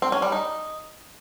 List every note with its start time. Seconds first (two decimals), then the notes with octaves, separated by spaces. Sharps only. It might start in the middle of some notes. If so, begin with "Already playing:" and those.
0.02 C4
0.12 C#4
0.22 G3
0.32 D#4